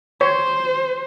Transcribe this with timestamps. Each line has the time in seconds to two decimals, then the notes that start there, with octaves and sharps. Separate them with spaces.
0.21 C5 C#5